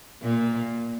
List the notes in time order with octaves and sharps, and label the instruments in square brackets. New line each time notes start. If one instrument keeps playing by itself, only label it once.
[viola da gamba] A#2 A#3